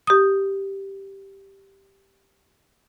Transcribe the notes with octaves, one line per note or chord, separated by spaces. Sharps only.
G4 D#6